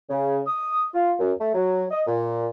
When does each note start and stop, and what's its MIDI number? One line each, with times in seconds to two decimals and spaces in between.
0.09 0.38 49
0.46 0.84 87
0.93 1.12 65
1.18 1.33 42
1.39 1.51 57
1.54 1.84 54
1.91 2.00 75
2.06 2.47 46